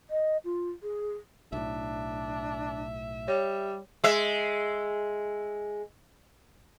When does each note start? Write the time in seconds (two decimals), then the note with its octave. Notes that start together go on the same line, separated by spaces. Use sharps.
0.10 D#5
0.45 F4
0.83 G#4
1.52 B1 A2 D4 E5
3.28 G3 C#5
4.04 G#3 E5